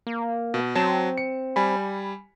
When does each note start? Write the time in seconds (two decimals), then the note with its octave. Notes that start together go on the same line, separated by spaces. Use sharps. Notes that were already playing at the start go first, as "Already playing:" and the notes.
0.07 A#3
0.54 B2
0.75 F#3 C4 A5 E7
1.18 C#7
1.56 G3 G#5 B5